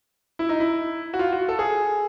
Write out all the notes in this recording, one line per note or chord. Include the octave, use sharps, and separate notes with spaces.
E4
D#4
E4
F#4
F4
F#4
A4
G#4